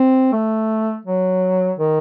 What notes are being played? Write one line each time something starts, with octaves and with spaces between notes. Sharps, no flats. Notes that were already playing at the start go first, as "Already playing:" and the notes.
Already playing: C4
A3
F#3
D#3